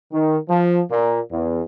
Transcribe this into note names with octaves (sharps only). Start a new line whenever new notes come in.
D#3
F3
A#2
E2